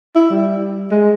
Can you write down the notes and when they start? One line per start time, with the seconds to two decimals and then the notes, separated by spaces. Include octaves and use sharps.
0.15 E4
0.30 G3
0.91 G#3